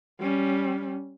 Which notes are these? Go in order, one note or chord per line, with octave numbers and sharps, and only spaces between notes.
G3 C#4